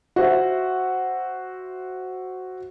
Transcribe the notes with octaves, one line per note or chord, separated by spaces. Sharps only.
F#4 C5 E5